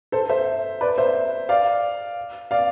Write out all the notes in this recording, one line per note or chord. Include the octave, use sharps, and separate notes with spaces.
A4 C5
C5 E5
B4 D5
C5 E5
D5 F5
D5 F5